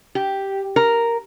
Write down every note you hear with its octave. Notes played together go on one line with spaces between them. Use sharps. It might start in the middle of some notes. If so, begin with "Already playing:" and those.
G4
A#4